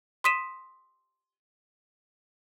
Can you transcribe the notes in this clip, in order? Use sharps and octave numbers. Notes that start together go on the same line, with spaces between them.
C6 D#6 B6 D#7 E7